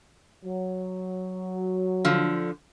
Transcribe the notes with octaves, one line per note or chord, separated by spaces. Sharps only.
F#3
D3 F3